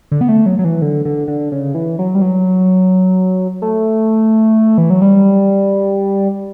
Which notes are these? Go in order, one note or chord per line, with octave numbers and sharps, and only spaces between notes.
D3
B3
A3
F#3
F#3
E3
D3
D3
D3
C#3
E3
F#3
G3
F#3
A3
E3
F#3
G3